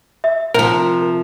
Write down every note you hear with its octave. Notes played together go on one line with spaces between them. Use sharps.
E5
C3 F3 A#4